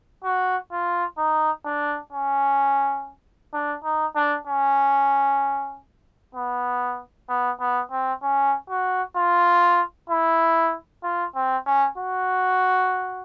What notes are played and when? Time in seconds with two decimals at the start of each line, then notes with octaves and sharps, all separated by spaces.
0.24 F#4
0.72 F4
1.18 D#4
1.65 D4
2.13 C#4
3.54 D4
3.84 D#4
4.16 D4
4.47 C#4
6.35 B3
7.29 B3
7.60 B3
7.91 C4
8.23 C#4
8.70 F#4
9.16 F4
10.10 E4
11.04 F4
11.35 C4
11.66 C#4
11.98 F#4